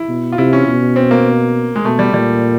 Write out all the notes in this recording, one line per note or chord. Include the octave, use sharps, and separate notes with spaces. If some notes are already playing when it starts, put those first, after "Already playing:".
Already playing: E4
B2
F4
C3 E4
C#4
B2
C4
A#3
G#3
B2 A3
G3
A#2 G3